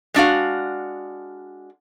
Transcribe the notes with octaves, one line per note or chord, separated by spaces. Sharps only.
G#3 D4 F#4 F5